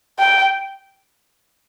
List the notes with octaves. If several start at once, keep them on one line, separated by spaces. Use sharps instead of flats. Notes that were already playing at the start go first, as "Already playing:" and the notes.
G5